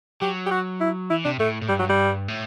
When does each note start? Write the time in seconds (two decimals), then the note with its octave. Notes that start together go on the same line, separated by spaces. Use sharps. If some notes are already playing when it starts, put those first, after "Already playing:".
0.21 F#3 G4
0.46 G4
0.51 F#4
0.81 E4
1.10 E3 E4
1.25 C3 D4
1.39 A2 A3
1.62 A2
1.69 G2 G3
1.79 F#3
1.89 G3
2.28 A2